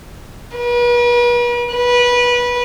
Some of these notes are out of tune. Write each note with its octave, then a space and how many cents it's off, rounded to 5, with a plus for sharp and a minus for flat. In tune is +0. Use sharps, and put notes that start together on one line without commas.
B4 -40
B4 -20